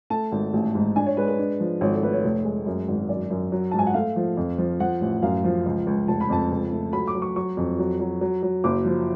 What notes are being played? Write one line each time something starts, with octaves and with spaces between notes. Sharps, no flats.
A3 A5
G#1
A1
G#2
D4 G#5
C#5
G#3 B4
B4
D4
F3
G#1 C#5
A4
A3 B4
C#5
F1
G#3
F#2
G#1
F#2 D5
F#2
F#3
G#2 A5
G#5
F#5
A3 F5
F3
F2
F3
F3 F#5
A1
F#2 F5
F3
C#2
C#2
F1 A5
B5
F2 A5
C#2
A3
F#3 B5
D6
F#3
C#6
F#3 C#6
F2
F#3
F#3
F#3
F#3
F#1 D6
F3